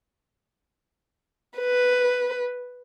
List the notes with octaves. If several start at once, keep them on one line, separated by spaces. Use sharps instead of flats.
B4